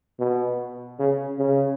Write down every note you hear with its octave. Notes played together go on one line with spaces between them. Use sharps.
B2
C#3
C#3